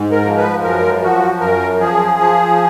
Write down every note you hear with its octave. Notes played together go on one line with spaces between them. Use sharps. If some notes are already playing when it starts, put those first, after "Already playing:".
Already playing: G#2
A#4
F3
B4
F#2 A#4
F3 F#4
F#2 A#4
F3 G#4
F3